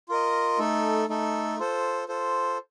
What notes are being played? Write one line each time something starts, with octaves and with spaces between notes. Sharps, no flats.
F4 A#4 D#5
A3 D#4 A4
A3 D#4 A4
F4 A4 C5
F4 A4 C5